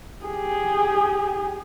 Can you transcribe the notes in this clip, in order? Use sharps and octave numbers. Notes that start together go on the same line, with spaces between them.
G4 G#4